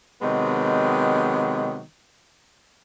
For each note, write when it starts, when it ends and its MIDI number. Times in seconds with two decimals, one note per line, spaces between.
0.21 1.80 48
0.21 1.80 51
0.21 1.80 54
0.21 1.80 56
0.21 1.80 59